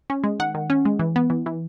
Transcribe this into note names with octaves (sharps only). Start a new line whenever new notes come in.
C#4
G#3
D#3 F#5
D#3
C#4
G#3
E3
B3
E3
E3